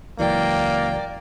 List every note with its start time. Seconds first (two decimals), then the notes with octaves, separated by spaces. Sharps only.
0.19 C#2 E3 F#3 A#3 D5 G5